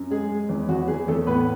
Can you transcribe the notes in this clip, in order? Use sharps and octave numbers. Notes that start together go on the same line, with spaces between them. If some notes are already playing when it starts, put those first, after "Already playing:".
Already playing: F#2
G#3 G#4
G#3
E2
E2 F#4
E2 G#4
E2 A3 A4
A2 B3 B4